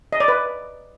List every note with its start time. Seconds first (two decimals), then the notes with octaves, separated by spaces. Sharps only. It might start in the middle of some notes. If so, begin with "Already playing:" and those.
0.13 D#5
0.20 D5
0.28 B4